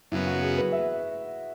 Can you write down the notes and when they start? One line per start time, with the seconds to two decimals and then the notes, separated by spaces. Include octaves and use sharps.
0.12 F#2 C#3 F#3 B3 E4
0.26 F#4
0.42 G#4
0.57 B4
0.72 E5